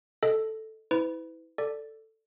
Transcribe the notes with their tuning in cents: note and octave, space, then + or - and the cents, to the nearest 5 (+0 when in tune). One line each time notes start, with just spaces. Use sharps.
A4 +0 D#5 +0
E4 -25 B4 +35
A4 +10 D5 +0